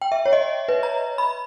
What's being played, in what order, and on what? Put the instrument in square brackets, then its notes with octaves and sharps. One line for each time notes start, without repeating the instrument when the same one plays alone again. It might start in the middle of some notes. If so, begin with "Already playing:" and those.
[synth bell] G5
E5
C#5
D#5
B4
A#5
B5